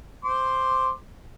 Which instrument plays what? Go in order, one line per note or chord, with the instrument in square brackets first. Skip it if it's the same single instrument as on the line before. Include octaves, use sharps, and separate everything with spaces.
[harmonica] C5 C6 D6